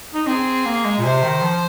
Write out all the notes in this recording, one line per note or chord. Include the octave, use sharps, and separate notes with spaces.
D#4
C4 G#4
A#3
G#3
A#2
C3 C5
D#3
F3